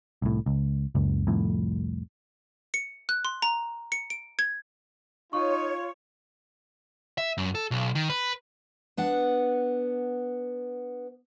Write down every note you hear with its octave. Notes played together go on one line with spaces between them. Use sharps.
C2 A2
C#2
F#1 C#2
C2 F2 A2
C#7
F#6
C6
A#5
C#7
D7
G#6
D#4 F4 C#5 C#6
E5
F#2
A4
B1
D#3
B4
B3 D4 F#5